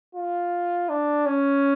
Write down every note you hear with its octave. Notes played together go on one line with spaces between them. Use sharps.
F4
D4
C#4